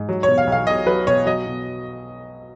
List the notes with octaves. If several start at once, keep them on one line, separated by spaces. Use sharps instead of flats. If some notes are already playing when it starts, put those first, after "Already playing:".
Already playing: G#2
F#3
B2 C#5
F5
B1
F5
B1 D#5
F#3 B4
B2 C#5
F#3 D#5
B2